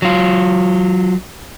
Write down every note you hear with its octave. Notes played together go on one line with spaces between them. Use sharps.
F#3 F4